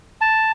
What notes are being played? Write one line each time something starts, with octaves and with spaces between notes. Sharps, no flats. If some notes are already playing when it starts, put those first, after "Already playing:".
A5